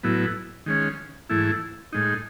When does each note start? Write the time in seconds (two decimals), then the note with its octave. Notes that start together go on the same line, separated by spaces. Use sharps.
0.03 A2 F#3 B3 E4
0.66 D#3 G#3 C#4
1.29 G#2 E3 A3 E4
1.93 A2 G#3 D#4